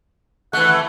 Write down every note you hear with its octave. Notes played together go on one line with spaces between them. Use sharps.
E3 A3 F#5